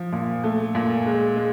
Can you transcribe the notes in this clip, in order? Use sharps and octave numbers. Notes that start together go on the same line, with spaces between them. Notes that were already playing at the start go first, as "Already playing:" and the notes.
Already playing: F3
A#2
A3
A#2
G#3
G#3